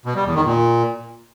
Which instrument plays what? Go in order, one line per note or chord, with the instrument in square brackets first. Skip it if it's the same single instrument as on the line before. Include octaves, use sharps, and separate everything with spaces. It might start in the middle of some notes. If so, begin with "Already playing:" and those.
[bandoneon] B2
G3
E2
D#3
A#2